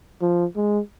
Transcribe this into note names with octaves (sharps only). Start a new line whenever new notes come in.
F3
G#3